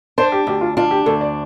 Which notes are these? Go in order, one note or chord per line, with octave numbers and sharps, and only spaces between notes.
D4 C5
G4
D2 G4
F4
D4 F4
G4
D2 A4
D5